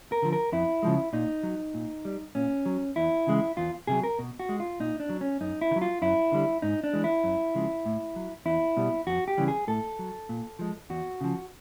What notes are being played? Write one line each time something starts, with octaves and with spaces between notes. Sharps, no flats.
A#4
D3 F3
A#4
F2 E4
C#3 F3 G#3
A#2 D#4
F#3
A#2
G3
A#2 C#4
F#3
E2 E4
C#3 E3 G#3
E2 F4
C3 D#3 F#3 G#4
A#4
B2
F#4
G#3
F4
A#2 D#4
D4
F#3
C#4
F#2 D#4
E4
D#3
F#3
F4
F#2 E4
D3 G3
G#2 D#4
D4
E3 G#3
E4
F#2
C#3 F3 G#3
A2
F#3
E2 E4
B2 G3
F2 F#4
G4
C#3 E3 G3
G#4
A2 A4
F#3
A#2
F3 G#3
E2 F#4
C#3 F3